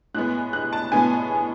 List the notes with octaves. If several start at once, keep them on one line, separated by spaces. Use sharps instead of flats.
A2 G#3 B3 F#6
F#6
A5
A2 G#3 B3 G#5